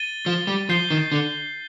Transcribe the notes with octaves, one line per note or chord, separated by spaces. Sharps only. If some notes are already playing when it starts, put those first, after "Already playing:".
Already playing: A6 D#7 G7
F3
G3
F3 G6 C7 G7
D#3
D3